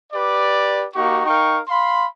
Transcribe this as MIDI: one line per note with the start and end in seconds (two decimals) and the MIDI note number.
0.13 0.85 67
0.13 0.85 71
0.13 0.85 74
0.95 1.25 58
0.95 1.25 63
0.95 1.25 66
0.95 1.25 67
0.95 1.25 85
1.26 1.60 63
1.26 1.60 70
1.26 1.60 77
1.26 1.60 79
1.26 1.60 85
1.68 2.05 77
1.68 2.05 83
1.68 2.05 84